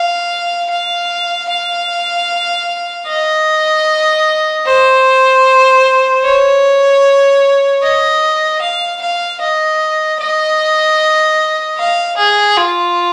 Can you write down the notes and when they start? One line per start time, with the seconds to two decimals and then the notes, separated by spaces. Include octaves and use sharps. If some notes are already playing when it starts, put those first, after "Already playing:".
Already playing: F5
0.70 F5
1.50 F5
3.08 D#5
4.67 C5
6.25 C#5
7.83 D#5
8.62 F5
9.02 F5
9.41 D#5
10.20 D#5
11.78 F5
12.18 G#4
12.58 F4